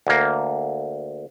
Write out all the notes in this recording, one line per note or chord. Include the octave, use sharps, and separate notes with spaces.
D2 A#3